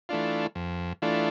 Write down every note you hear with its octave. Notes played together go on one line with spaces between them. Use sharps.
E3 A3 D4 F4
F2
E3 A3 D4 F4